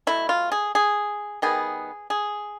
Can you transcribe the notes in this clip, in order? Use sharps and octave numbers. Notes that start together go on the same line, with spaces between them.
B2 F#3 A3 E4
F4
G#4
G#4
D#3 G3 B3 G#4
G#4